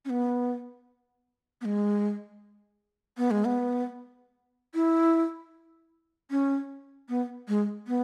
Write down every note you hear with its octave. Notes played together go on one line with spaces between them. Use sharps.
C#4
B3
B3
G#3
B3
G#3
B3
E4
C#4
B3
G#3
B3